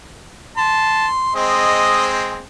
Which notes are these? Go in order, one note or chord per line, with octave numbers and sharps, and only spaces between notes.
A5 C6
G#3 C4 C5 D#5